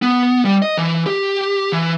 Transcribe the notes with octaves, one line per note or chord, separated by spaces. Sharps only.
B3
G3
D#5
E3
G4
E3